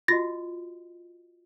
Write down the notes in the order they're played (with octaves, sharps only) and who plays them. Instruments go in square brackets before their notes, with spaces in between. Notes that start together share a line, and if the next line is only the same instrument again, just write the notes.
[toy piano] F4 F#4 D#5 [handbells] A6 A#6